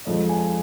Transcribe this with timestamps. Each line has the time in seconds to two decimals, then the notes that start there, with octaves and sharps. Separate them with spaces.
0.05 F2 F3 G#3 D#5
0.29 G#5